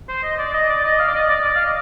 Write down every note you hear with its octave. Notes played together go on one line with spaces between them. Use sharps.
C5
D#5
D5
D#5
D5
D#5
F5
D5
D#5
D5
D5
F5
D#5